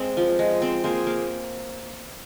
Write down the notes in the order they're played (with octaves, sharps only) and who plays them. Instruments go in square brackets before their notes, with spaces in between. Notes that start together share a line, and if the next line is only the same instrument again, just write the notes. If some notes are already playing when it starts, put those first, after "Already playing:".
Already playing: [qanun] G#3 C4
F3
G#3
C4
A#3 G#4 C5
A#3